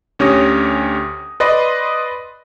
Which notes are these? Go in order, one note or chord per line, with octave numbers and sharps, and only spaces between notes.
D2 C#4 G4 C#5 D#6 A#6
B4 D5 D#5 C6